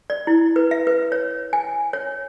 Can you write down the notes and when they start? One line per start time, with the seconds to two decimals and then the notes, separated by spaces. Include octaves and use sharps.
0.10 D5
0.27 E4
0.56 B4
0.71 E5
0.87 B4
1.12 C#5
1.53 G#5
1.93 C#5